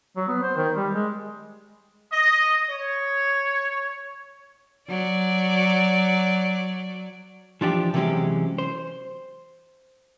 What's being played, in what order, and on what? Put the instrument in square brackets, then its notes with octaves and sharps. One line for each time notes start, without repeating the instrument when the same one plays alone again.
[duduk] F#3
B3
C5
D#3
G3
G#3
[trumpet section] D#5
C#5
[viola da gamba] F#3 D5
[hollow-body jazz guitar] E3 F3 D4 G4
C3 E3 F#3 G#3 C#4 G4
C5